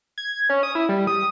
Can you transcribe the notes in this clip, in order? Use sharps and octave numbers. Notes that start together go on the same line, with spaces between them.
G#6
C#4
D#6
E4
G3
D#6